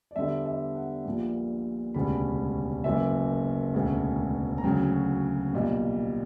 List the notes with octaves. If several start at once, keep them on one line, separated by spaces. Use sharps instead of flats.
D5
E2 D3 G3 E5
E5
F#5
A#1 A#2 G3
E1 D2 C#3 G3 B5
F#1 F#2 E3 E5
E1 D2 C#3
A#5
D2 C#3 F#3 G5
B1 A#2 G3